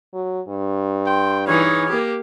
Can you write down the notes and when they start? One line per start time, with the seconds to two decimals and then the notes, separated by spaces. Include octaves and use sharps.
0.13 F#3
0.48 G2
1.06 G5 C6
1.47 E3 D#4 G#4 C#5 F6 G#6
1.89 A#3 G4